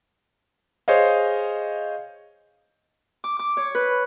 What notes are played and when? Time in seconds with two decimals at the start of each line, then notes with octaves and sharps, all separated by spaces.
0.88 G#4 C5 C#5 D#5 F5
3.24 D6
3.39 D6
3.57 C#5
3.75 B4